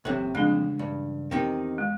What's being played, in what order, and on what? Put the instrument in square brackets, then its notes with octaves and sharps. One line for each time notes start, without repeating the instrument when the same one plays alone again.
[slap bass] F#1 E3 [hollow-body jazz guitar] A2 C3 [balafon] A4
[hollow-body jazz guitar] F2 [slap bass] C#3 E3 G3 [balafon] G#3 D4 G#4
[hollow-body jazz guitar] G2
[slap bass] E2 [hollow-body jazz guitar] C3 D#3 D#4 [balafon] G5
[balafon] G#3